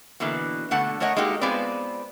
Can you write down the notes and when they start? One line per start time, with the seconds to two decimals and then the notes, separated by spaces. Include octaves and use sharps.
0.20 B2 D3 E3 A#3 B4
0.71 B2 D3 A3 F#5
1.00 A3 A#4 C#5 D#5 F#5
1.17 G#3 A#3 D#4 F#4 G4 A4
1.41 G#3 B3 C4 F4 B4 D5